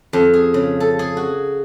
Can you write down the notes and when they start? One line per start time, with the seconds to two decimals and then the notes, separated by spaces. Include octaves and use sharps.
0.13 F2
0.34 G#4
0.54 C#3
0.80 A4
0.99 G#4
1.17 F#4